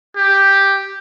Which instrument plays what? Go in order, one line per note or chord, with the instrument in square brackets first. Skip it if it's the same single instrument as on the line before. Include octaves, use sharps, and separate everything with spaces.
[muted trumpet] G4